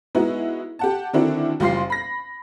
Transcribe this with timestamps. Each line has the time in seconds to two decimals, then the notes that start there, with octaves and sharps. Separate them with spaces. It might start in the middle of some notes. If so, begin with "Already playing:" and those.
0.15 G#3 B3 D#4 E4 F#4
0.79 G4 F#5 A5
1.13 D3 D#3 C4 D4 E4 F#4
1.60 F#1 G3 F4 F5 C6 C7
1.90 B5 A#6